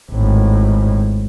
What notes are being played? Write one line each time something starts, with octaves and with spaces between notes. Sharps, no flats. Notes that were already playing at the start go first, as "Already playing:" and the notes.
G#1 A2